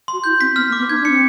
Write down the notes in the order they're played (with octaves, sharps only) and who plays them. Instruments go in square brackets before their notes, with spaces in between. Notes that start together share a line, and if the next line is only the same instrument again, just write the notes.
[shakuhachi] F#4 [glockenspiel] C6
[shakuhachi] E4 [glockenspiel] G6
[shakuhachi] C4 [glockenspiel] B6
[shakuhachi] B3 [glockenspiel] F6
[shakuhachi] A#3
[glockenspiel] D6
[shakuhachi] B3
[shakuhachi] D#4 [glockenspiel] G#6
[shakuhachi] D4
[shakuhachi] C4 [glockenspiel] C#7